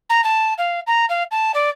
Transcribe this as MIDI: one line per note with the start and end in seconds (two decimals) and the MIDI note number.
0.09 0.23 82
0.24 0.54 81
0.58 0.80 77
0.87 1.05 82
1.09 1.23 77
1.31 1.52 81
1.54 1.69 74